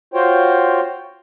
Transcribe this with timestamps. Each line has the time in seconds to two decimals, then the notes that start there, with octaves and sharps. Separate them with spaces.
0.14 F4 F#4 C5 C#5 G5